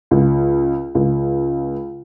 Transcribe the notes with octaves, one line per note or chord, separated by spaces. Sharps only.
C#2
C#2